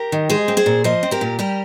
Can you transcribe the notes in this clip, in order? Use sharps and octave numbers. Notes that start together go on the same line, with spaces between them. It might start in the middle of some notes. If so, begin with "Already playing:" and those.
Already playing: G4 A#4
D#3
G#3 G#4 C5
C4
G#4 C5
A#2
F3 C5 D#5
C4
G4 A#4
A#2
G3 G4 A#4